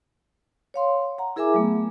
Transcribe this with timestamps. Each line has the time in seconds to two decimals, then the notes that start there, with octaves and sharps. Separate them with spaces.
0.74 C#5 F5 C6
1.18 F#5 A#5
1.36 E4 G#4 A#4 E5 G#5 D6
1.54 F#3 A3 B3